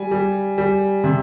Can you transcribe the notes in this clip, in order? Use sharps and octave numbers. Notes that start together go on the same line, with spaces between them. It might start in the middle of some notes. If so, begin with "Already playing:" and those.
Already playing: G3 G#5
G3
G3
C3